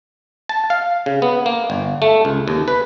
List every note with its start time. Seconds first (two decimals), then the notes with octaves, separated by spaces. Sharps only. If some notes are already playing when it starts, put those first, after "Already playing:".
0.49 A5
0.70 F5
1.06 C#3
1.22 B3
1.46 A#3
1.70 G1
2.02 A3
2.25 C#2
2.48 D#2
2.68 B4